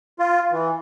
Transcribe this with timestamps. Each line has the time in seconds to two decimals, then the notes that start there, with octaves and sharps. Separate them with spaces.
0.19 F4
0.52 E3